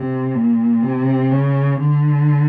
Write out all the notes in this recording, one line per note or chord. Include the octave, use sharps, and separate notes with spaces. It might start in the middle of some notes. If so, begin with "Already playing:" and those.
Already playing: C3
A#2
C3
C#3
D3